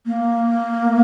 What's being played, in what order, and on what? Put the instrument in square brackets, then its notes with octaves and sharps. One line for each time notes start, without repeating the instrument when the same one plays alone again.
[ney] A#3